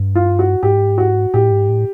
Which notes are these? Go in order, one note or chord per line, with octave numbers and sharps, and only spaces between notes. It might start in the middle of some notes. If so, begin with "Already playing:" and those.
Already playing: G2
F4
F#4
G#2 G4
F#4
A2 G4
G#2
A2